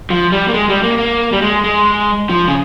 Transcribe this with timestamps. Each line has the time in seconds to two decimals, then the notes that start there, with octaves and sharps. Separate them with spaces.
0.10 F3
0.32 G3
0.48 A#3
0.54 G#3
0.69 G3
0.83 A#3
0.98 A#3
1.32 G3
1.42 G#3
1.64 G#3
2.29 F3
2.47 C#3